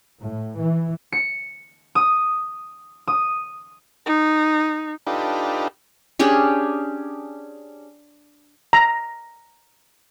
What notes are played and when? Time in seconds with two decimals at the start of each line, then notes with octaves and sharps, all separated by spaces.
0.19 A2
0.58 E3
1.12 C#7
1.95 D#6
3.08 D#6
4.06 D#4
5.07 D4 D#4 F4 G4 A4 B4
6.19 C#4 D4 G4 G#4
8.73 A#5